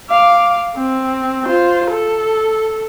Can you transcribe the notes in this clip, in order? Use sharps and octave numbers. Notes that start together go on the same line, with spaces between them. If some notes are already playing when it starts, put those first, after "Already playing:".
F5 D6
C4
F4 C5
A4